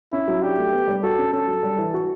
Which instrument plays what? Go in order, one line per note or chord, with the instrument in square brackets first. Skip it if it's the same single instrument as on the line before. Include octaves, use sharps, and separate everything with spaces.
[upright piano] C#4 [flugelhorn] E4
[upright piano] F#3
[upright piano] D4 [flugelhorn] G4
[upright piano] A3
B3
G3
[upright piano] F#4 [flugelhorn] A4
[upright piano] C#4
[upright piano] C#4 [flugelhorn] A4
[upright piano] F#3
G3
E3
F#4